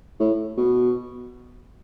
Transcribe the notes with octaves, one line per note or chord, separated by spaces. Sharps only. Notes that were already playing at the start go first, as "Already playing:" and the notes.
A2
B2